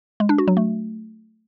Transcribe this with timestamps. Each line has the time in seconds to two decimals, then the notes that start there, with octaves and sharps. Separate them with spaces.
0.20 G#3
0.29 D4
0.38 F#4
0.48 F#3
0.57 A3